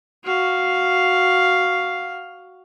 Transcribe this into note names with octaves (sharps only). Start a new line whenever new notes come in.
F#4 F5